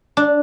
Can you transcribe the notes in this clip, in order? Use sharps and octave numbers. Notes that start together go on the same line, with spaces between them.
D4